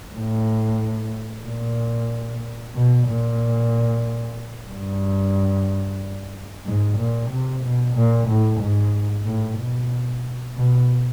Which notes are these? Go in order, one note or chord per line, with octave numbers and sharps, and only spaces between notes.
A2
A#2
B2
A#2
G2
G#2
A#2
C3
B2
A#2
A2
G#2
A2
B2
B2